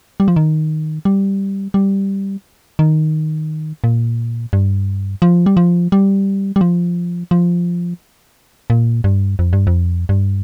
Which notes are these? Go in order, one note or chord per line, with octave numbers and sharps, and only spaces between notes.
G3
F3
D#3
G3
G3
D#3
A#2
G2
F3
G3
F3
G3
G3
F3
F3
A#2
G2
F2
G2
F2
G2